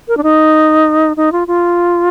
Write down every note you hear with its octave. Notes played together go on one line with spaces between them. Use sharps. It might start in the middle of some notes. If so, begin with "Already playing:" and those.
A#4
D4
D#4
D#4
F4
F4